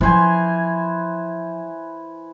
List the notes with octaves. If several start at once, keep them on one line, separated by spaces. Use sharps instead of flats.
E3 F3 F4 C5 G#5